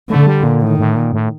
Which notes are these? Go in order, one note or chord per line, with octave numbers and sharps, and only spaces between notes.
D3 A3
G3
A#2
A2 D#3
A2
A#2
A2